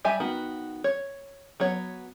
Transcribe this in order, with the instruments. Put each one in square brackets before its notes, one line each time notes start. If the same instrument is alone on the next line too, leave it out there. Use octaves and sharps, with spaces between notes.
[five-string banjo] G3 G4 E5 G#5
D#3 B3 F#4
C#5
F#3 B3 C#5